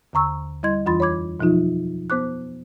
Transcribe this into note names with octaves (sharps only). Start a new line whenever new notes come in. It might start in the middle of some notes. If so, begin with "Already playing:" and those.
D#2 D3 A#5 C#6 E6
G3 E4 D#5 C6 G#6
F2 E3 F4 B5 C6 A6
C#5 B5 D6 G#6
B2 F3 F#3 D#4 F4
B3 C5 D6 F#6